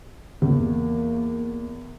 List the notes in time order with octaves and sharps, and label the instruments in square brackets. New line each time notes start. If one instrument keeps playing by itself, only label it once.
[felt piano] E2 [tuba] A#3